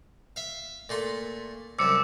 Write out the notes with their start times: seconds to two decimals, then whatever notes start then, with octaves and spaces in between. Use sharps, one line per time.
0.36 E5 F5
0.89 A#2 A3 C6
1.79 C2 F#2 F3 D6 E6 C#7